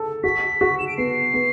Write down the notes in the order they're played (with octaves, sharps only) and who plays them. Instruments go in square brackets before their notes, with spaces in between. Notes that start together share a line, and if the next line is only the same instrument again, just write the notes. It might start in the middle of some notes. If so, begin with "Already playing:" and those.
Already playing: [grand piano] A4
[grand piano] F#4 [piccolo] B6
[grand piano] F#4
[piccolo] E7
D7
[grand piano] B3 [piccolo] C7
[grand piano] B3